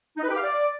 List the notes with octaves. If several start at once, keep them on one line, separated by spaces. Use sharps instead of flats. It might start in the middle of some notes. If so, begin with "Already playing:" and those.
D#4
B4
G4
F5
D5